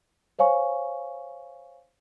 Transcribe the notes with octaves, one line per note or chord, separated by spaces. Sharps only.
C5 C#5 F5 G#5 C#6